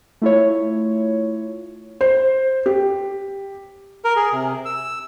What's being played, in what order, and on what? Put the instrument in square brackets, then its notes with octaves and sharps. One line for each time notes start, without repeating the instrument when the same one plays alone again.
[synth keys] A3 E4 F4 C#5
[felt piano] C5
G4
[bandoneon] A#4
G#4
C3
E6